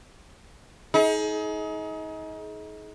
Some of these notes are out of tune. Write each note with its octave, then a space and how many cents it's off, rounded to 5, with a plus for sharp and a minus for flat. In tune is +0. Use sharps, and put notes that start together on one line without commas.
D#4 +30 G#4 +35